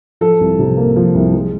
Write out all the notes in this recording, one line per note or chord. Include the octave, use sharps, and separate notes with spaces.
F3 A4
C2
C3
A#3
F3
C2
G#3